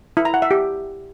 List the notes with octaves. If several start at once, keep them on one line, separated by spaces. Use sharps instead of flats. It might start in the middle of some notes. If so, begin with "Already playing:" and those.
E4
A#5
F#5
E5
G4